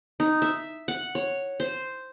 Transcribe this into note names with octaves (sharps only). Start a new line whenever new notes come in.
D#4
E5
F#5
C#5
C5